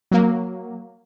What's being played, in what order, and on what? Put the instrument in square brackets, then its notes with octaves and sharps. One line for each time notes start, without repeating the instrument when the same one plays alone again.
[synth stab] F#3 A#3